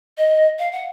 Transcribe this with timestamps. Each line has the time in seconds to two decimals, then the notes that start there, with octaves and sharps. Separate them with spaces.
0.18 D#5
0.59 F5
0.72 F#5